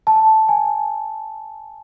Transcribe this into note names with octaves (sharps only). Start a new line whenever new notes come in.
A5
G#5